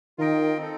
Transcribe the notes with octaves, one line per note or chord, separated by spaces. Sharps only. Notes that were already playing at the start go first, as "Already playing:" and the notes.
D#3 F4 A#4 D#5 G5
C4 D#4 A4